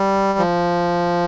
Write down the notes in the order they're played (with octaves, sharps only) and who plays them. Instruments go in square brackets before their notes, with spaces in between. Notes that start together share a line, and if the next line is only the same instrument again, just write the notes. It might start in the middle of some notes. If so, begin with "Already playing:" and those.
Already playing: [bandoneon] G3
F3